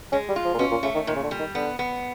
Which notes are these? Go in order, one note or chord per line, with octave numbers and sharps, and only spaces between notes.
G#3 C#4
G3
F4
F3
A#2
B2 C#4
A#2
C#3 A3
D#3
A#2 D#3
C#3
D3
G3
D#3
D3 B3
B3